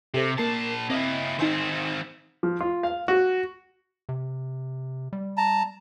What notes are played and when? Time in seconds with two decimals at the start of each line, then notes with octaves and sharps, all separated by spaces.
0.14 C3 G4 A4 C5
0.38 A#2 A#3 A#4 A5 C7
0.90 A#3 C4 E4 D#5 F5
1.39 D#3 C4 D#4 G#5 C6
2.43 F3
2.60 F4
2.83 F5
3.08 F#4
4.09 C3
5.13 G3
5.37 A5 A#5